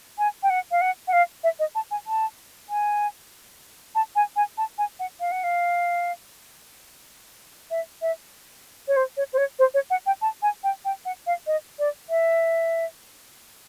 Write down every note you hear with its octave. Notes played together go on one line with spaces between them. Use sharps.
G#5
G5
F#5
F5
F#5
F#5
F5
E5
D#5
A5
G#5
A5
G#5
A5
G#5
G#5
A5
G#5
F#5
F5
F#5
F5
E5
E5
C#5
C5
C#5
C5
C#5
C5
C#5
F#5
G5
A5
G#5
G5
G5
F#5
F5
D#5
D5
E5